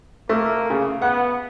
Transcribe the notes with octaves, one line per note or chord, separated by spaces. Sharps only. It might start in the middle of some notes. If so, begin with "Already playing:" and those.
A3 A#3
C#3
B3 F#5